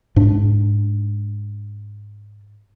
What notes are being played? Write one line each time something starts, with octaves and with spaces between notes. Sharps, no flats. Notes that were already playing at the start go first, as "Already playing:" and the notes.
G#2 D4